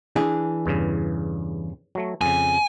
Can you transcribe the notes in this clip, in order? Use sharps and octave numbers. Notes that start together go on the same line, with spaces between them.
E3 D4 G#4
E2 G2 C#3
F#3 A3
F2 C#3 G#5